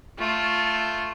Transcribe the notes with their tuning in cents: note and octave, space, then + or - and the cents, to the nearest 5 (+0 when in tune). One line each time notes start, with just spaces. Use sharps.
A3 +0 F4 +0